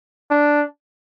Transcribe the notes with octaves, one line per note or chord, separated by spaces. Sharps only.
D4